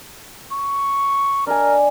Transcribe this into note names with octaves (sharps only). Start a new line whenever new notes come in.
C#6
D4 A#4 D#5 G#5